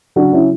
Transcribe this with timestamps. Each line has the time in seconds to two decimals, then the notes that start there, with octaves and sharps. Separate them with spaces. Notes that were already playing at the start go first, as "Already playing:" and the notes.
0.16 C#3 F#3 D4 F#4
0.33 C#4 E4